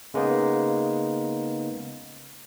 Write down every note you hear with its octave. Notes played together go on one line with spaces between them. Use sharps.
C#3 G#3 A#3 B3 D#4